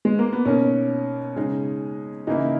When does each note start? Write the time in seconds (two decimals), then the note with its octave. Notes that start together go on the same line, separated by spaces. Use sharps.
0.05 G#3
0.19 A#3
0.33 B3
0.45 B2 A#3 C#4 D#4 A#4
1.36 C#3 G#3 D#4
2.27 C#3 E3 A#3 D#4 E4